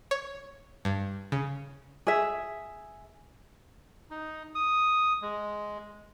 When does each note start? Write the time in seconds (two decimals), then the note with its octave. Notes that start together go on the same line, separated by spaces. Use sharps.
0.11 C#5
0.85 G2
1.32 C#3
2.07 G#4 E5
4.11 D#4
4.55 D#6
5.22 G#3